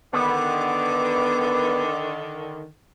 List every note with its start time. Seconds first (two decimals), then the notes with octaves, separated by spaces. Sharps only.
0.13 D3 D#3 B3 D6